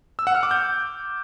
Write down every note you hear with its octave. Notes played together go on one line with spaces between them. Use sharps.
E6
F#5
F6
D6
G6